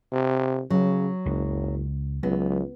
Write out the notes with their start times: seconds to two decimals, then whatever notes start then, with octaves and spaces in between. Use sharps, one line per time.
0.12 C3
0.70 C#3 F#3
1.26 F#1 C#2
2.23 C#2 F#3 B3